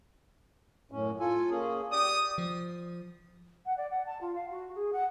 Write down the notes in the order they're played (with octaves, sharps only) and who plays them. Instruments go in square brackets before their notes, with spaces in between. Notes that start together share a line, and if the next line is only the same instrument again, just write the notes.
[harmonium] F#2 A2 C#4
F4 A4 G#5
A#3 C#4 G#4
[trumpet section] G4 D#6 [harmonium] D5
[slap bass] F3
[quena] F#5
D5
F#5
A5
F4
F5
F#4
G#4
F#5